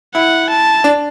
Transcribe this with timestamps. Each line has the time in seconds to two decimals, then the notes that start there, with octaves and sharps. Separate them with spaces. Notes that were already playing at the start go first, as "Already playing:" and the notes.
0.15 E4 F#5
0.49 A5
0.84 D4